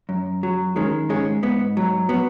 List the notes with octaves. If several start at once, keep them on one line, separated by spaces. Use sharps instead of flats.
F#2
F#3
D#3 G#3 C#4
G#2 G#3 C#4
G#2 B3
F#3
F#3 B3